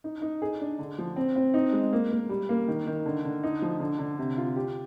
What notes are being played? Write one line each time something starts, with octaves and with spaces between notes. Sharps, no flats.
D#4
D#4
G#4
D4
D3
F3
C4
C4
D#4
G#3
A#3
A#3
G3
A#3
D#3
D#3
D3
D3
D#4
F3
D3
D3
C3
F4
G4